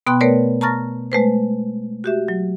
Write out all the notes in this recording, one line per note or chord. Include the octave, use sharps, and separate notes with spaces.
B2 B3 G5 B5 C6 F#6
A3 B3 A#4 B4 C#5 D5
A5 A#5 C#6 F6 A6 A#6
G#3 A3 B4 C5
F#4 G4 E5
F#3